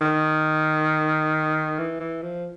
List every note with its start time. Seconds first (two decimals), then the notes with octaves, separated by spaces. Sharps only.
0.02 D#3
1.79 E3
2.00 E3
2.22 F3